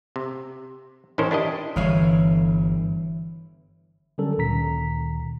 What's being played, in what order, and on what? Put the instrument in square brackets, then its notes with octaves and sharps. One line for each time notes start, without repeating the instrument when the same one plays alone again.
[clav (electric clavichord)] C3
A1 A2 D#3 C#4 A#4 C5
D4 E4 G4 D#5
[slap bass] G1 [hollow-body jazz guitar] E3 C#5 F5
[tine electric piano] D3 F#3 G3 C#4 A4 A#4
D2 A#2 D#3 A#5 B6